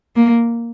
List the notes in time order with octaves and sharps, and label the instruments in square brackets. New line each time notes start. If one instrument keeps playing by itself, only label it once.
[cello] A#3